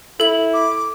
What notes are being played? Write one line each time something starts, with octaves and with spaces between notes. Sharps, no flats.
E4 A4 F#7
D6